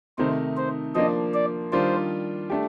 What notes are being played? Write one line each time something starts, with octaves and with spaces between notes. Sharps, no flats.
C3 D#3 A3 D#4 C5
C5
F3 A#3 D4 D#5
D5
D#3 G3 D4 F4 C5
A3 D4 G4